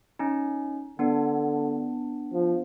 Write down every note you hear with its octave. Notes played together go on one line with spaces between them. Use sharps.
C#4 D#4
D3 B3 D4
F3